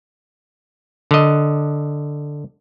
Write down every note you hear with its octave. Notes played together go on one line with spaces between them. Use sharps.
D3 D#5